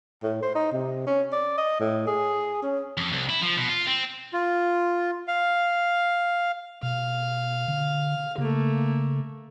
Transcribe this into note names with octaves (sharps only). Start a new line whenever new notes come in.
A2
C5
D#4
C3
C#4
D5
D#5
A2
G#4
C#4
F2
C2
E4
F3
B2
F4
C4
F4
F5
B2 F5
D3
C#3 A3 A#3